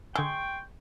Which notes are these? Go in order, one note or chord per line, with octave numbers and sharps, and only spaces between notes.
D3 G#3 G5 C6 C#6 E6